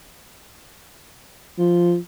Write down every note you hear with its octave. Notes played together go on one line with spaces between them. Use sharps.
F3